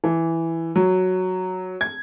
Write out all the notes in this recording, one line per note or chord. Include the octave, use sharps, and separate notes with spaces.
E3
F#3
G#6